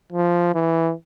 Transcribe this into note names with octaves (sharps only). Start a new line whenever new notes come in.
F3
E3